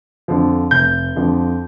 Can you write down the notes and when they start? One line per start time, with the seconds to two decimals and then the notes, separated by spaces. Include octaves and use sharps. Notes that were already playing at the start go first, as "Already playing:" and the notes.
0.28 F2 D3 F3
0.71 F1 G6
1.15 F2 D3 F3